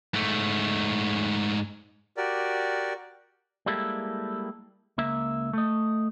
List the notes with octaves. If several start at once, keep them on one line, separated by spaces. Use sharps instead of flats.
G#2 A3
F#4 G4 A#4 D5
G3 G#3 A#3 E4 G4 A4
C#2 A#3 E5
A3 D#5